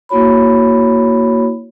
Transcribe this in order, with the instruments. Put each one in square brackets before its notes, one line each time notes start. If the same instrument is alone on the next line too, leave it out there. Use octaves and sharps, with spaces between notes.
[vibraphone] A#3 E4 F#4 C#5 B5